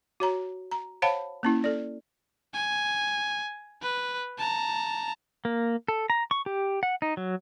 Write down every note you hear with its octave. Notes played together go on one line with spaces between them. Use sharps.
F#4 C#5 A#5
A#5
C5 C#5 F5 F#5 A5 B5
A#3 C#4 E4
A4 D5
G#5
B4
A5 A#5
A#3
A4
A#5
C#6
G4
F#5
D#4
F#3